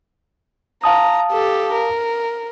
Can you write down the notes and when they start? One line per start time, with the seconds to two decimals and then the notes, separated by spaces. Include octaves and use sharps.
0.84 F5 A5 A#5 D#6
1.32 G4 A4
1.73 A#4